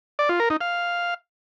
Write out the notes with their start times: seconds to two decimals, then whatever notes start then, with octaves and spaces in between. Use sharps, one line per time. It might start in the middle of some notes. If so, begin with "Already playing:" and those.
0.19 D5
0.29 F4
0.40 A#4
0.50 D#4
0.61 F5